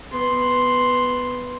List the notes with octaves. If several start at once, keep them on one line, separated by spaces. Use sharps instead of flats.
B3 C6